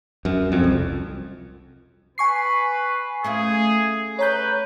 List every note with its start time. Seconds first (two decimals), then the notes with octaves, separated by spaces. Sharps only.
0.25 F#2
0.52 F2
0.64 C2
2.18 B4 G#5 C#6 C7
3.24 A3 C#4 F4 G#4
4.19 B4 C#5 A#5 G6